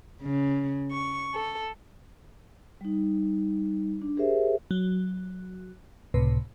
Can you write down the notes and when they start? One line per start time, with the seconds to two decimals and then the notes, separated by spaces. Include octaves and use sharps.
0.23 C#3
0.92 C#6
1.36 A4
2.81 G3 D#4
4.02 D4
4.17 G4 G#4 A#4 C5 E5
4.71 F#3
6.14 C#2 A2 C3 B4